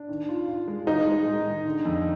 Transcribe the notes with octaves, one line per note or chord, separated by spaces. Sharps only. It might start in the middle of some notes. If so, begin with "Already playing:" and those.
Already playing: D4
D#3
F4
F4
G#3
D#3 D#4
G#3
G#3
D#3
D3
F2